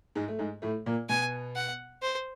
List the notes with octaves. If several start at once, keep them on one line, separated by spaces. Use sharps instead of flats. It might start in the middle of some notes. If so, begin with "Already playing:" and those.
G#2 G#3
A3
G#2 G#3
A2 A3
A#2 A#3
B2 B3 G#5
F#5
C5